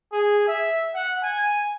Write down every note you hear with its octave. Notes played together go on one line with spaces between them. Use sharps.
G#4
E5
F#5
G#5